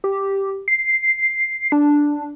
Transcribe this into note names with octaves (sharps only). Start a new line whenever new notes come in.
G4
C7
D4